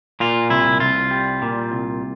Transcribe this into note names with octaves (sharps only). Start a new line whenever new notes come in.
A#2 F4
C2 E4
C2 F4
G3
A#2
C2